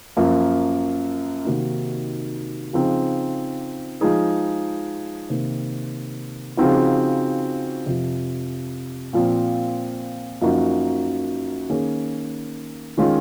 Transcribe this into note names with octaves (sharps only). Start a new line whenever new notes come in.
F#2 F3 A#3
C3 D#3 A#3 D#4 F#4
C#3 F3 C4 D#4
F3 G#3 D#4 G#4
C3 D#3 A#3
C#3 F3 C4 D#4 F#4
F2 C3 F3
A#2 F3 C4
F#2 F3 A#3 D#4 F#4
D#3 A#3 C#4 G#4
D#3 G#3 C#4 F4